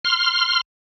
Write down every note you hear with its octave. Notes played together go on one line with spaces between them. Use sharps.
C6 F6